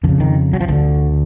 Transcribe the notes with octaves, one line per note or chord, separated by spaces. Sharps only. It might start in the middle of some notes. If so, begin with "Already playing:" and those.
F2 D3
C#3
D#3
F#3
F3
D2 D3 E3